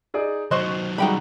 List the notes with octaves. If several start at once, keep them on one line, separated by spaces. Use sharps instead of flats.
D#4 G#4 D5
D#3 F#3 F#4 C5 D#5 C6 C#6 F#6
G3 G#3 D#4 F#4 G5 B5